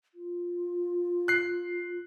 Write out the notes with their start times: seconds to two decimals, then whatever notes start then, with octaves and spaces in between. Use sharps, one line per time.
0.15 F4
1.28 F#6 C7